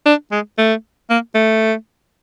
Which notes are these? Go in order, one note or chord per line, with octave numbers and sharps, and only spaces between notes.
D4
G#3
A3
A#3
A3